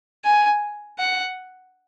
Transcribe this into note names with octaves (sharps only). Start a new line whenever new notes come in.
G#5
F#5